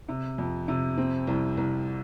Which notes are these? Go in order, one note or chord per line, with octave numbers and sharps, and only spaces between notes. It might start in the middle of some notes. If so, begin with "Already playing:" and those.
C3
F2
C3
C4
C2
C2